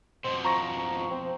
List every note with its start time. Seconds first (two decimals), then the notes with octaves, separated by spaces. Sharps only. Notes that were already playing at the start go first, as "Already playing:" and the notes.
0.25 F2 B2 C5
0.45 F3 A#5 C#6 A#6
1.11 C4